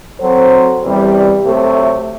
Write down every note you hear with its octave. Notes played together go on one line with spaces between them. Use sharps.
F#3 C4 F#4 A4 C5
E2 C3 G3
C3 F#3 A3